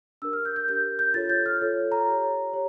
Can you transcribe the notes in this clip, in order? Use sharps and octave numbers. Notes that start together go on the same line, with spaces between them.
D4 G4 A#4 E6
F6
G6
G6
D4 G4 A#4 G6
G6
F4 A4 C#5 A6
G6
F6
F4 A4 C#5
A#5
G4 C#5
G4 C#5